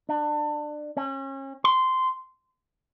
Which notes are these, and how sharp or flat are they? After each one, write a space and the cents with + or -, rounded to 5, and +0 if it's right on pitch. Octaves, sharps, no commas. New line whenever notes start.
D4 +25
C#4 -35
C6 -10